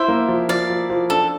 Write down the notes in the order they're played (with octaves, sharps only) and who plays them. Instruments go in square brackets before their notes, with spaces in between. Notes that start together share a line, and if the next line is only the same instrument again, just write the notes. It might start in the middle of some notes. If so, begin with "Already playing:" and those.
Already playing: [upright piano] E4 [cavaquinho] C5 E5
[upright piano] A#3
F3
[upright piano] F3 [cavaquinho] D5 F5
[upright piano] F3
F3
[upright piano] D4 [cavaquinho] A4